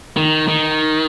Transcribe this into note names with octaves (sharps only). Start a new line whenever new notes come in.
D#3
D#3